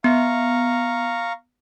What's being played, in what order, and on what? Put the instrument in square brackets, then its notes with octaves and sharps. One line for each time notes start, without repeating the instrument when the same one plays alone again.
[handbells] B3 [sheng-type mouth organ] F5 A#5 C#6